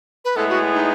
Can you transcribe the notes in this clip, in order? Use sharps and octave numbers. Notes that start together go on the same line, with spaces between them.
B4
A2 G#3 B3 E4 G#4 A4
F#4
D#4